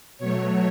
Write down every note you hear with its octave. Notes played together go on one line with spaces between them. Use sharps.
B2 F#3 A3 C#5